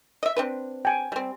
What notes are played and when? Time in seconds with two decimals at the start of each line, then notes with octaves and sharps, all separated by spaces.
0.23 D#5 E5
0.36 C4 D4 B4
0.85 G5 G#5
1.12 G3 C4